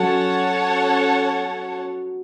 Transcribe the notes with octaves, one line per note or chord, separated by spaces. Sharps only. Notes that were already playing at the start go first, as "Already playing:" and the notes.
Already playing: F#3 C#4 A4 C#5 F#5 A5